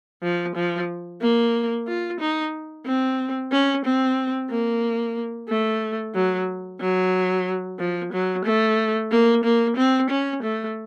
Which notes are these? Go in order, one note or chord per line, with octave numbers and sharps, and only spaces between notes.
F3
F3
A#3
F4
D#4
C4
C#4
C4
A#3
A3
F#3
F#3
F3
F#3
A3
A#3
A#3
C4
C#4
A3